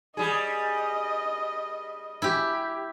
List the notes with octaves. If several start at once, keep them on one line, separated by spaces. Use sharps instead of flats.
G3 G#4 D#5
E4 G4